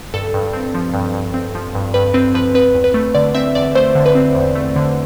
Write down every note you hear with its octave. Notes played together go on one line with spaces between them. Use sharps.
G2 A4
G2
C4
F3
G2
G2
C4
F3
G2
G2 B4
C4 B4
F3 B4
C4 B4
E2
B4
A3
D3 D5
C4 E5
E2 D5
A3 C5
D3
B4
C4
E2
A3
D3